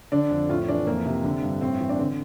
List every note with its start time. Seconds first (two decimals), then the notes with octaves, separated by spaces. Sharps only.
0.12 D3 D4
0.31 F2
0.49 A2 F4
0.68 E3 D4
0.87 F2 A#3
1.06 C3
1.24 D3
1.43 G2
1.61 A2 C4
1.80 E3
1.89 D4
1.99 D3 C4